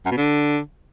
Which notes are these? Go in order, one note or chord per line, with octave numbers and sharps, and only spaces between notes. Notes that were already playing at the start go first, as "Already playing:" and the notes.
F#2
B2
D3